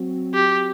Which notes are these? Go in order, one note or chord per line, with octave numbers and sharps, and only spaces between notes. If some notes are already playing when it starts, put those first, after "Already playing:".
Already playing: F#3 C4 F#4
G4